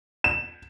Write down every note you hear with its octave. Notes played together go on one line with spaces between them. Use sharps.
E7